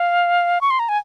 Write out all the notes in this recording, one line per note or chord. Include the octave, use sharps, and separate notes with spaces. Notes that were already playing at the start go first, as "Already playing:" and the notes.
Already playing: F5
C#6
C6
A#5
G#5